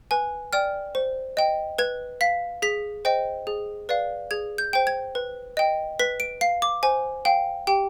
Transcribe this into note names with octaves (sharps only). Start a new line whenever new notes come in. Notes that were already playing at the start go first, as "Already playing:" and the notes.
B4 G#5
D5 G5 F6
C5
D#5 G5
B4 G#6
F5 B6
G#4 B6
C5 D#5 G5
G#4
B4 D5 F5
G#4 G#6
G6
C5 G5
G#6
B4
D#5 G5
B4 B6
D7
F5 C7
D6
C5 G#5
F5 G5
G4 G5